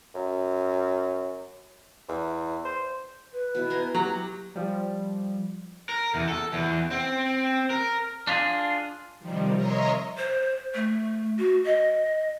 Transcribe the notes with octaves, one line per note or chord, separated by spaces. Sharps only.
F#2
E2
C5
B4
B2 E4
G#5 A#5 C6
F#3 G4 A#5
F3 G3
A#4
E2
A4
E2
C4
A#4
D4 F4 G4 G#4
C3 D#3 F3 G3
A#4 C#5 D#5 E5 A#5 C6
C5
A3
F#4
D#5